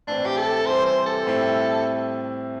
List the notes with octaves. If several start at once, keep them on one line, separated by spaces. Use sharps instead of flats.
A2 E3 C4 D4
G4
A4
C3 E3 G3 C4 E4 C5
C5
A4
A2 G3 C4 E4